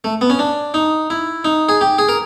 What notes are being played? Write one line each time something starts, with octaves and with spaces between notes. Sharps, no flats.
A3
B3
C#4
D4
D#4
E4
D#4
G#4
G4
G#4
A#4